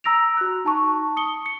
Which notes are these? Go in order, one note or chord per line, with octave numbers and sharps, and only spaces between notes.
A#5 E6 A#6 D7 F7
F#4 F#6
D#4 A5 C#6
D#6 C#7 G7
C#7